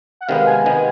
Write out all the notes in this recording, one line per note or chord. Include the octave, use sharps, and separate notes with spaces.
F#5
C3 D#3 G#3 B3 F5
G#5
C3 D#3 G#3 B3